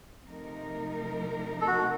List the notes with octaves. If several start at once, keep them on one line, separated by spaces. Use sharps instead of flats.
C3 F3 A3 D#4 A#4
A4
F#4